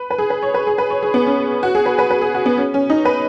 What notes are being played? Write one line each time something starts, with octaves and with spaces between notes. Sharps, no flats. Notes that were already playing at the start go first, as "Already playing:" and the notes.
Already playing: B4
B4
G#4
B4
C#5
B4
G#4
B4
C#5
G#4
B3
C#4
F#4
G#4
B4
B4
B4
G#4
F#4
B3
C#4
C#4
D#4
B4